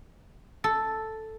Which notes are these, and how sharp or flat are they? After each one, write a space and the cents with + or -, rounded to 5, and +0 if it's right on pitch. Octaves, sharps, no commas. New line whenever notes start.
A4 +0